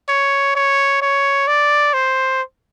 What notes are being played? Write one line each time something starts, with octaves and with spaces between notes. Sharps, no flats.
C#5
C#5
C#5
D5
C5